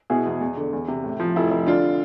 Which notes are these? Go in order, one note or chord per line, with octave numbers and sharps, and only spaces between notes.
B2 E4 G#4
E2
E2
D3
E2
C3
A2
F3
F1 E4
F1
D3 D4 F4